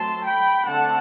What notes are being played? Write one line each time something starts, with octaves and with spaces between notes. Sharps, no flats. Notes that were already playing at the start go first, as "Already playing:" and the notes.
Already playing: F#3 A3 C4 A5 C6
G5 B5
D3 A3 C4 F#5 A5